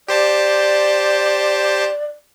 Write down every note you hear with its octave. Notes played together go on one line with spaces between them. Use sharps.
G4 C5 D5 A5